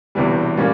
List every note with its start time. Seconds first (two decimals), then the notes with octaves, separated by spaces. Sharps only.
0.15 E1 E2 C3 E3 G3
0.57 A#2 G3 C#4